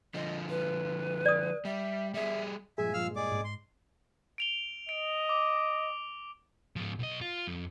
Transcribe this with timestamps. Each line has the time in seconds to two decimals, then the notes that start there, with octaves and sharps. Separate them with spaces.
0.14 D3 F3 D#5
0.50 B4
1.26 D5 D#6
1.65 G3 E5
2.14 G3 G#4 E5
2.78 G2 A#2 F3 G#3 G#4 E5 G#5
2.93 F3 F5 E6 F6
3.16 G#4 D5 D#5 D6
3.32 G#2
3.44 C6
4.38 D7 F7 G7
4.89 D#5 D7
5.29 D6
6.76 G#2 F3
6.99 B1 D#5
7.21 F4
7.47 F2